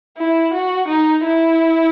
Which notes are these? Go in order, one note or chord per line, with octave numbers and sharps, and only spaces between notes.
E4
F#4
D#4
E4